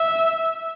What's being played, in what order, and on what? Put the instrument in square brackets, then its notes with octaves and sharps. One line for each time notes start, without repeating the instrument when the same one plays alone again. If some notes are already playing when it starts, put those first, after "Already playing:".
Already playing: [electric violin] E5